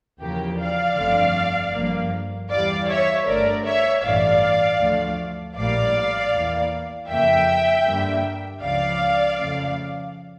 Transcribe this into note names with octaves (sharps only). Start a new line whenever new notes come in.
E2 C#3 F3 A#3 G4
D5 F5
G1 F2 D3 A3
G1 G2 F3 A#3
E2 E3 G3 D5 F5
C#5 E5
G1 G2 D3 A3 A#4 D5
C#5 E5
A1 G2 E3 A3 D5 F5
D2 D3 F3 A3
A#1 A2 G3 A#3 D5 F5
E2 E3 A#3
F2 C#3 F3 A#3 E5 G5
G2 D3 G3 A#3
C#2 C#3 F3 D5 F5
F2 C#3 F3 A3